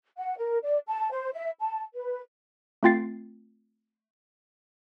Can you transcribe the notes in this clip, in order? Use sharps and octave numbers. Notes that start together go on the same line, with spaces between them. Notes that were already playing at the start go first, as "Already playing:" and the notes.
F#5
A#4
D5
A5
C5
E5
A5
B4
A3 C4 F4 G5 A6 C7